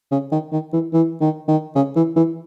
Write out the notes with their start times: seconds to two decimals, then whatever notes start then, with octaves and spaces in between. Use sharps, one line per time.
0.11 C#3
0.32 D#3
0.52 D#3
0.73 E3
0.93 E3
1.21 D#3
1.48 D#3
1.75 C#3
1.96 E3
2.16 E3